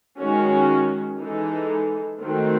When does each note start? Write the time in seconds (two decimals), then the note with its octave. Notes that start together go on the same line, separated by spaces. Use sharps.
0.19 D#3 G#3 C#4 F#4
1.19 E3 G#3 D#4 A4
2.20 D#3 A3 C4 F#4